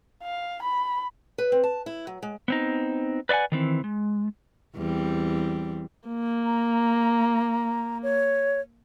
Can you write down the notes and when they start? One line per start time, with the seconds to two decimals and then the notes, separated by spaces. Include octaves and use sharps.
0.23 F5
0.63 B5
1.38 B4
1.52 C4
1.64 A5
1.86 E4
2.07 F#3
2.23 G#3
2.48 B3 C4 D#4
3.29 B4 D5 E5 F#5 G#5
3.52 D#3 E3 C4
3.84 G#3
4.75 E2 G3 C4
6.08 A#3
6.46 A#5
8.03 C#5